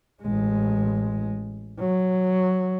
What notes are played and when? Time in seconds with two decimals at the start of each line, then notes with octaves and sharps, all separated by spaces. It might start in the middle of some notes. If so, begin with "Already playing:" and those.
0.22 A1 G#3
1.80 F#3